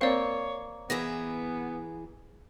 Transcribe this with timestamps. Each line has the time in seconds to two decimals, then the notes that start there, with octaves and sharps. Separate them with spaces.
0.01 A#3 C4 C#5 D5 F5
0.90 E3 B3 G#4 E5 A#6